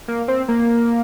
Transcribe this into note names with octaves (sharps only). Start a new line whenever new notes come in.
A#3
C4
A#3